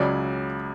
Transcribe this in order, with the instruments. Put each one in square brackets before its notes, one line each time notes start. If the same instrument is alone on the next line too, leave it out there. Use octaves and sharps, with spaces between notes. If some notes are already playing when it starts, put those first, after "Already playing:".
Already playing: [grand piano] C#2 C#3 F#3 D5